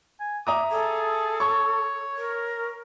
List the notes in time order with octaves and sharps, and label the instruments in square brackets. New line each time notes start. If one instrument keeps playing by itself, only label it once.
[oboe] G#5
[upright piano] E5 A#5 D#6 [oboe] D6
[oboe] G#4 [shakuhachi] A4
[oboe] C#5 [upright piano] C#6
[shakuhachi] A#4